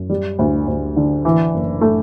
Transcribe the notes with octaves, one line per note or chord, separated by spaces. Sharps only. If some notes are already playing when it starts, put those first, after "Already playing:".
Already playing: F#2
G3
D2
D2
D3
E3
F#1
A3